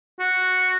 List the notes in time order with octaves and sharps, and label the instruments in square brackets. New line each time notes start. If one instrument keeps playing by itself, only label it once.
[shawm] F#4